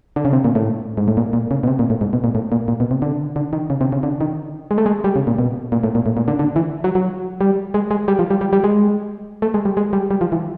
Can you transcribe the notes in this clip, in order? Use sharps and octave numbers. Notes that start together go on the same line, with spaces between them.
D3
C#3
C3
A#2
A2
G#2
A2
A#2
A#2
C#3
B2
C3
A#2
A2
G#2
B2
A#2
A2
A#2
A#2
B2
C3
D3
D3
D#3
C#3
C3
C#3
D3
D#3
G#3
A3
G#3
G3
C#3
A#2
B2
A#2
A2
A#2
A2
A#2
D3
D3
E3
F#3
F#3
G3
G#3
G#3
G3
F3
G3
G3
G3
G#3
A3
G#3
G3
G#3
G3
G3
F3
E3